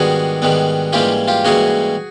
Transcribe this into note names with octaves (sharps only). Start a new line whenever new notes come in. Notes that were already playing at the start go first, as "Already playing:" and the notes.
Already playing: G#2 D#3 G3 B3 D4 F#4 G#4
G#2 D#3 G3 B3 D4
G#2 E3 G3 A#3 C#4 F4 G4
F4 G4
G#2 E3 G3 A#3 C#4 F#4 G#4